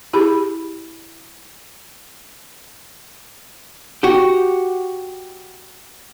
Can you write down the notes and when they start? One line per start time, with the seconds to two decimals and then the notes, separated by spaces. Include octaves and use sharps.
0.13 E4 G4 G#4 B5
4.03 F#4 G4